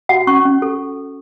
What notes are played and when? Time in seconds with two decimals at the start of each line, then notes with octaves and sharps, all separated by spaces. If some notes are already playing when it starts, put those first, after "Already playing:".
0.09 F#4 F#5
0.27 C#4 C#6
0.45 C#4
0.62 A4